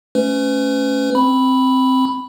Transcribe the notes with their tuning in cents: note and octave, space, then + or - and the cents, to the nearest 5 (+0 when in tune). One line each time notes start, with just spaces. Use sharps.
A3 +0 C#4 +0 B4 +40
C4 +0 B5 +0